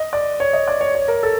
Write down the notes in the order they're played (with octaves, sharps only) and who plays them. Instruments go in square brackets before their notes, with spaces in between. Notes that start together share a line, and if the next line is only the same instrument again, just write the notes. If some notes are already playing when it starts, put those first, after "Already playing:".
Already playing: [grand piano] D#5
D5
C#5
D#5
D5
C#5
C#5
A#4
A4